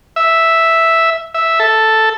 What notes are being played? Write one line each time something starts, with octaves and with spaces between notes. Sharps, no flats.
E5
E5
A4